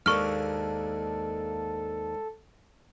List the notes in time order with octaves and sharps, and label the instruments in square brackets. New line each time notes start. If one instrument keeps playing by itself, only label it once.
[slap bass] D#2 [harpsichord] G#2 A#3 D4 [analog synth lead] A4 [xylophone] C#6 F6